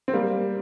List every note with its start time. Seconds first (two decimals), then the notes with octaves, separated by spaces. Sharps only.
0.08 C4
0.13 G3 A#3